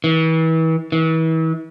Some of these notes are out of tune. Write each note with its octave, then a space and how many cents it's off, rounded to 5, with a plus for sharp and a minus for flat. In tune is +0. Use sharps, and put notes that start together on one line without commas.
E3 -35
E3 -35